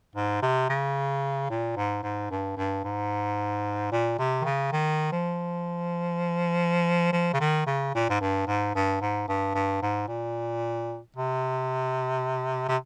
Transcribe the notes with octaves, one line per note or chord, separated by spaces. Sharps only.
G#2
C3
C#3
A#2
G#2
G#2
G2
G2
G#2
A#2
C3
D#3
C#3
D#3
F3
F3
C#3
D#3
C#3
A#2
G#2
G2
G#2
G2
G#2
G2
G2
G#2
A#2
C3
C3